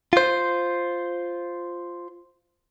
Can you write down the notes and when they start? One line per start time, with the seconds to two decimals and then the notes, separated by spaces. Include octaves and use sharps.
0.13 F4 C5